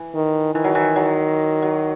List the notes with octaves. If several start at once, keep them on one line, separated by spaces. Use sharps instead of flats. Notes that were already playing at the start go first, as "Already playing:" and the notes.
Already playing: E3
D#3
D#3 E3
F#3
E3
F#3
F#3